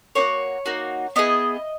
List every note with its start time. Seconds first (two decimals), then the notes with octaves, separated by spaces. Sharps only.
0.15 A#3 D#4 F#4 C#5
0.66 A#3 D#4 F#4
1.16 B3 E4 G#4 D#5